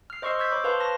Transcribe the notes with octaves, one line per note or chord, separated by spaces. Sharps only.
F6 C7
C5 D#5 C6 C#6 E6 C7
C#6 E6 G6 G#6 B6 C7
C#5 B5 D6
B4 C5 F5 A5 B5 C6
A5 C#6 F6 A#6